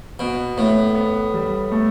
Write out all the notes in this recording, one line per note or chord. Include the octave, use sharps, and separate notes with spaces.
B2 B3
A2 B3
B3
G3
A3